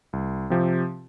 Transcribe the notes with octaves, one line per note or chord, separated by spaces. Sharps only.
C2
C3 F3 C4 G4